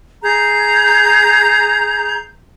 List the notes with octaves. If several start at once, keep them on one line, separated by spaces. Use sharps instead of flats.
G#4 A#5 G6